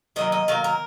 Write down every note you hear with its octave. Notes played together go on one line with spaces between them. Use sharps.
D#3 F#3 A#3 D#5
D#5
D#3 F#3 A#3 F5
A#4